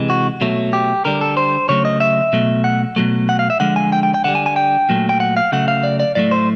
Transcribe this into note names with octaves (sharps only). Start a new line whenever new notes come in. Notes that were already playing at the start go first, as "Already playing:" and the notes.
Already playing: C3 E3 G#3
F#4
B2 F#3 A3
G4
D3 G3 A#4
A4
C5
C#3 F#3 A3 C#5
D#5
E5
B2 F#3 A3
F#5
B2 F#3 A3
F#5
F5
E5
D3 F3 G#3 F#5
G#5
G5
G5
G5
D3 G3 F#5
G#5
G#5
G5
A#2 F#3 A3
G5
F#5
F5
C#3 F#3 A3 F#5
F5
D5
D5
A2 F#3 A3 D5
C5